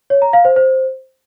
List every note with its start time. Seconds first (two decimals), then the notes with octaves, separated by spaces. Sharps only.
0.10 C#5
0.22 A#5
0.33 F5
0.45 C5
0.56 C5